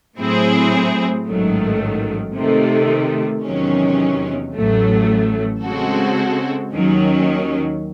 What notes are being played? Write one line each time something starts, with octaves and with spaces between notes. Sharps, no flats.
A2 F#3 C4 E4 G#4
A1 G#2 D#3 F#3 A3
C3 D#3 A3
E2 C3 D#3 F#3 C#4
A1 A2 F#3 A3
C#3 G#3 C4 F#4 A4
D#2 D#3 F#3 C#4